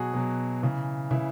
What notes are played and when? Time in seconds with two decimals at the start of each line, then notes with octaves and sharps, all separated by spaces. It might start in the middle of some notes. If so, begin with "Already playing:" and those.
Already playing: B2 F#3 F#4 G#4
0.14 B2 F#3
0.62 C#3 E3
1.11 C#3 E3 E4